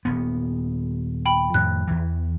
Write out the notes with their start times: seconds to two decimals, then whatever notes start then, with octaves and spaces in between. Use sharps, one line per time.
0.05 D#1 D#2 B3
1.26 G5 B5
1.54 F2 A2 D#3 F#6
1.87 E2 E3